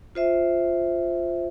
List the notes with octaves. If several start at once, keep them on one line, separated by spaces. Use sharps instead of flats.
F4 C5 E5